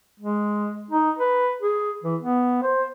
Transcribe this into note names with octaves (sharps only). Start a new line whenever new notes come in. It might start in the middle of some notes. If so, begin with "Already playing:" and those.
G#3
D#4
B4
G#4
E3
B3
C5